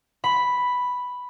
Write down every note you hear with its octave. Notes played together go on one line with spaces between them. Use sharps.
B5